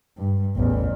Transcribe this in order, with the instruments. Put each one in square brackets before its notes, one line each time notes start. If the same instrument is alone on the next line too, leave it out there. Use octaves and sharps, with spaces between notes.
[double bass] G2
A1 E2